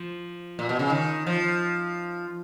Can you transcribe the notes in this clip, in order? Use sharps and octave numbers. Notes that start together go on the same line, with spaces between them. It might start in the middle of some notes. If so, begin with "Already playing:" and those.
Already playing: F3
A#2
B2
C#3
D#3
F3